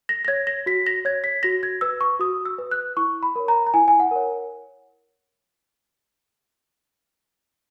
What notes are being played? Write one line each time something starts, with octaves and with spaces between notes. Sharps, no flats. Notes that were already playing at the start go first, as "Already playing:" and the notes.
A#6
A#6
C#5 G#6
A#6
F#4 B6
A#6
C#5 G#6
B6
F#4 A#6
G#6
B4 E6
C#6
F#4 D#6
E6
B4
F#6
E4 C#6
B5
A#4 C#5
A#5
A#5
E4 G#5
G#5
F#5
A#4 C#5